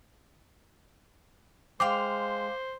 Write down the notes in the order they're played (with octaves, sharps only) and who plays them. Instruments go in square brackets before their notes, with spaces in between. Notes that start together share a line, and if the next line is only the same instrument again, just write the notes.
[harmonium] G#3 [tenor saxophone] C5 [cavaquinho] F5 G5 C6 [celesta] D6